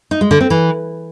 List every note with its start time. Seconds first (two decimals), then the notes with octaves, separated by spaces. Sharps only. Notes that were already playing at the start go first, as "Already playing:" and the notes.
0.11 D#4
0.21 G#3
0.31 D3
0.41 C4
0.50 E3